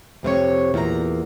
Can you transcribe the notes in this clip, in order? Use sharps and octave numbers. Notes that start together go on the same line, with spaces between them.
F2 C3 F4 C#5
E2 A#2 F4 A#5